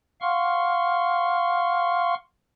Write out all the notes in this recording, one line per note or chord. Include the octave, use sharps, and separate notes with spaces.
F5 F#5 C6 C#6 F6